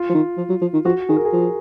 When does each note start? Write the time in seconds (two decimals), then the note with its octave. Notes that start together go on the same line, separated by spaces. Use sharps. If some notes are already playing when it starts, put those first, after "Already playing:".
Already playing: F4
0.09 F3
0.14 D#3
0.37 F3
0.49 F#3
0.62 F3
0.73 D#3
0.85 F3 F#4
1.09 D#3 G#4
1.16 A#4
1.25 G#4
1.33 F3